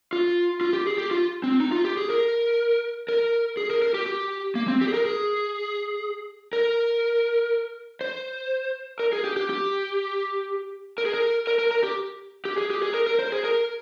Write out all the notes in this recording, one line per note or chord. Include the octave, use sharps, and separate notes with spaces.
F4
F4
G4
G#4
G4
F4
C4
D#4
F4
G4
G#4
A#4
A#4
G#4
A#4
A#4
G4
G4
A#3
C4
G4
G#4
A#4
G#4
A#4
C5
A#4
G#4
G4
G4
G4
A#4
G#4
A#4
A#4
A#4
A#4
G4
G4
G#4
G4
G#4
A#4
A#4
C5
G#4
A#4